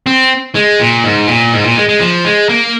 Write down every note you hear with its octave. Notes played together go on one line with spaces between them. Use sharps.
C4
G#3
A#2
G#2
A#2
G#2
A#2
G#3
G#3
F3
G#3
A#3